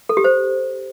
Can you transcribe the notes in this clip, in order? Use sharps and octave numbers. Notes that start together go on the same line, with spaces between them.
A4
G4
C5